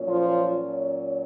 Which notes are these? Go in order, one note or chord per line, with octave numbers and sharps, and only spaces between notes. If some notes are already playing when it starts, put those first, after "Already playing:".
Already playing: A#2 F#3 C#4
F3 F4